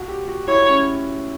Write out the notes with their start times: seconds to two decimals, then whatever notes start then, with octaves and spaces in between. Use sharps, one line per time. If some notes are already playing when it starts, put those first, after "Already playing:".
Already playing: F#4
0.08 G4
0.28 F#4
0.48 E4 C#5
0.68 C#4